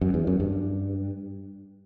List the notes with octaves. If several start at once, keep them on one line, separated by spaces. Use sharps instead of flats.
F#2
E2
F#2
G2